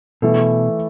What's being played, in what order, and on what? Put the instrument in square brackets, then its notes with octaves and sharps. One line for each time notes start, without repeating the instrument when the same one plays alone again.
[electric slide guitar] B2 [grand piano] E3 A3 E4 A4